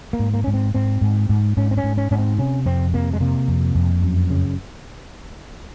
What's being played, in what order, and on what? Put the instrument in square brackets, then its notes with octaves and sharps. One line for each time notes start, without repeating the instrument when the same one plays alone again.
[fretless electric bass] A#3
G#2
A#3
G#2 C#4
C4
G#2 C4
G#2
G#2
G#2 C#4
C4
C#4
G#2
C#4
G#2 C#4
C4
C3 C#4
F2 C4
C3 A#3
G#3
C3 A#3
F2
F2
F#2
C#3